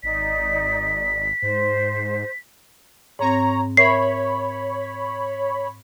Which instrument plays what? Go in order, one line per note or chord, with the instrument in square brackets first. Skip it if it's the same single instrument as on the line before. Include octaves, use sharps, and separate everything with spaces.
[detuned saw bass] G#1 [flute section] D#4 D5 [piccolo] B6
[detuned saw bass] G#2 [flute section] C5
[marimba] G#2 C4 [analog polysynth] C#5 A#5
[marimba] A#4 E5 [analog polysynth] C#5 B5 [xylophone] C7